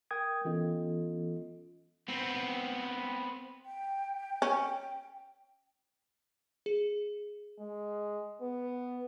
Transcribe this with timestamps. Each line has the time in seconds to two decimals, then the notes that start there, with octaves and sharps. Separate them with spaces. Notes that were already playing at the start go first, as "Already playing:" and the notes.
0.11 A#4 G5 D#6 G#6
0.45 E3 B3 C#4 F4 A4 D#5
2.08 B3 C4
3.66 G5
4.42 C#4
6.66 G#4
7.59 G#3
8.41 B3